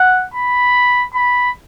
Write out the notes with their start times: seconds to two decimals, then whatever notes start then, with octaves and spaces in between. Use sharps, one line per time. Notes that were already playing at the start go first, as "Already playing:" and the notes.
Already playing: F#5
0.34 B5
1.14 B5